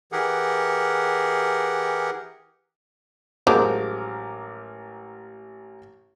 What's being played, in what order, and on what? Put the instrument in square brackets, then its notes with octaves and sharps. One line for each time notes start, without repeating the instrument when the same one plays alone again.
[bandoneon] E3 G4 G#4 A#4 F#5
[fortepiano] A1 A#4 D6 [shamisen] F3 F#3 G#3